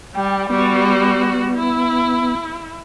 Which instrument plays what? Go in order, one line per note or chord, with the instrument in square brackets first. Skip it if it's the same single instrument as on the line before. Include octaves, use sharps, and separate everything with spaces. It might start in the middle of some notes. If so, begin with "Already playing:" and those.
[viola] G3 [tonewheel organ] G5
[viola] G3 F#4 [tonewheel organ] B3
[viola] E4